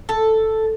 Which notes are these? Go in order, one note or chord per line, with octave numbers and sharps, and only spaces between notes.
A4